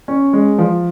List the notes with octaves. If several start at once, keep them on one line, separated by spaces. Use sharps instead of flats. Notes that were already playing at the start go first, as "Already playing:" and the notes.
C#4
G#3
F3